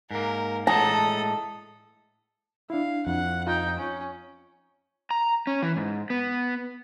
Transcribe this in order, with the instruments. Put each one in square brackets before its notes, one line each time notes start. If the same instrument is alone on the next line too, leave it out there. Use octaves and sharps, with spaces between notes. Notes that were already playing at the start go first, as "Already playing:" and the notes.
[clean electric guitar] G#2 A#3 [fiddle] A#4
[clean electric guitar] A2 G#3 A#5 [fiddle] A4 D#6 [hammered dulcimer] A5
[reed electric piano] D4 E4 [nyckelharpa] F5
[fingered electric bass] F2 [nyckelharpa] F#5
[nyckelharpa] D#4 G5 [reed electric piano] F4
[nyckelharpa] C#4
[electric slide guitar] A#5
C#4
E3
G#2
B3